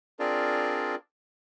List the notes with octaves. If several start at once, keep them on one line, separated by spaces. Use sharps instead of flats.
C4 D4 F4 G#4 A#4 D5